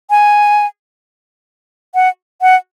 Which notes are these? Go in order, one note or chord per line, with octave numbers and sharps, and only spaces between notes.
G#5
F#5
F#5